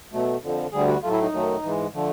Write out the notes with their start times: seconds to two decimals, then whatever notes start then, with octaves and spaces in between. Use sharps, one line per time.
0.13 B2 F#3 A3
0.42 F2 D3 F3
0.72 D2 D3 G3 G#4
0.88 F#4
1.02 A2 F#3 A3 F4
1.12 E4
1.22 D#4
1.32 F#2 D#3 F#3 A3
1.62 G#2 E3 G#3
1.93 D3 F3 A3